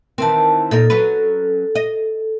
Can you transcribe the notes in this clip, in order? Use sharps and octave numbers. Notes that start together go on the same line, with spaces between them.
D#3 E3 C4 A#4 A5
A#2 D#4 A4 A#4
F#3 C#4 B4
D#5